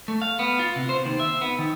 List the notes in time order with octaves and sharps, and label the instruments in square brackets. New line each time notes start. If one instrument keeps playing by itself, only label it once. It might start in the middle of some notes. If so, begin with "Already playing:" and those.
[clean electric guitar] A3
F5
B3
F4
C3
C5
D#2
E5
B3
D#3